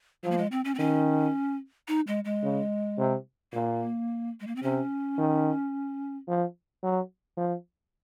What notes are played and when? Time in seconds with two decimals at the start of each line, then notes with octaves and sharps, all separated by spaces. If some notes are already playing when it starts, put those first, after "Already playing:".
0.24 F3 F#3
0.31 A#3
0.38 G#3
0.52 C4
0.65 C#4
0.75 C4
0.79 D#3 C#4
1.88 D#4
2.07 G#3
2.25 G#3
2.43 C#3
2.98 C3
3.53 A#2 A#3
4.40 G#3
4.47 A#3
4.56 C4
4.63 C3 C#4
5.18 D#3
6.28 F3
6.83 F#3
7.37 F3